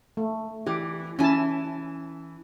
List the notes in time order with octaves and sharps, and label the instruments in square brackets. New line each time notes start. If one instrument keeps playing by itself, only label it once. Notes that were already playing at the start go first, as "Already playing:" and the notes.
[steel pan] A3
[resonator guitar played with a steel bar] E3 [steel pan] G4
[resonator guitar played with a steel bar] E3 G#5 [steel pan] C#4 E4 A5